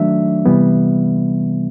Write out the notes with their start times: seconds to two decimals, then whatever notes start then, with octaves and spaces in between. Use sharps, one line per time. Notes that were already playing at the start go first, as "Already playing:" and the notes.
Already playing: D#3 F#3 A3 D4 E5
0.45 C3 E3 G3 B3